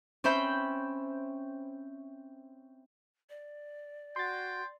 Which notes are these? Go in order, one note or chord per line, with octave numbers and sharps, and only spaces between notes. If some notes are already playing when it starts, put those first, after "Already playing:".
C4 C#4 C5 E5 B5 G6
D5
F#4 G5 C6 A6